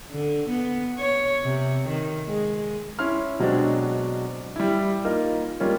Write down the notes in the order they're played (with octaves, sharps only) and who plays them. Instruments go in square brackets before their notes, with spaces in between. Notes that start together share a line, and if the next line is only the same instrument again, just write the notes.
[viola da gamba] D3
B3
C#5
C3
D#3
G#3
[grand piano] C#4 E4 C6 F6
B2 F#3 G#3 C4 D4
G3 E4
A#3 D#4 F4 A#4
G3 G#3 A#3 C#4 F4 C#5